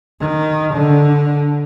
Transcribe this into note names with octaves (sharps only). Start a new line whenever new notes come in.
D#3
D3